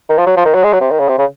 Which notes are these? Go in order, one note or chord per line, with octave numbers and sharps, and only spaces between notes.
D#3
F3
F#3
F3
D#3
F#3
G#3
F#3
C3
D#3
C#3
C3
C#3